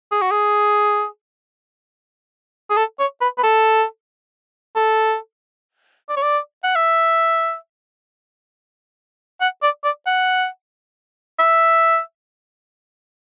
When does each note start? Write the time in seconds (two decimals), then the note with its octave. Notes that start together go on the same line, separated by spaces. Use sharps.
0.12 G#4
0.22 F#4
0.31 G#4
2.70 G#4
2.77 A4
2.99 C#5
3.21 B4
3.38 B4
3.43 A4
4.76 A4
6.09 D5
6.16 C#5
6.23 D5
6.64 F#5
6.75 E5
9.41 F#5
9.63 D5
9.84 D5
10.06 F#5
11.39 E5